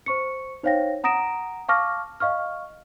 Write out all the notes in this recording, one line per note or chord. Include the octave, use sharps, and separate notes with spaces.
C5 C#6 C#7
D#4 C5 C#5 F5 G5 A#6
F#5 A#5 D#6 A#6 D7 E7
F5 A5 C#6 D6 F6 A#6
D#5 F5 C#6 F6